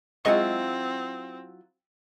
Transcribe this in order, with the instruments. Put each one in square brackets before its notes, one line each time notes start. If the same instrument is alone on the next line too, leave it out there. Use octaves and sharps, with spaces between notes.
[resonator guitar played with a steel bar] F#3 E4 F4 [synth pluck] G#3 D#5 C#6 [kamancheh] C4